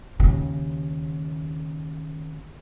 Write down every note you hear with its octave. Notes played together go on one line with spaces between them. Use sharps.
D#2 C#3